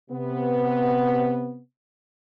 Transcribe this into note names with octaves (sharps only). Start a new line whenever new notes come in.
C3 B3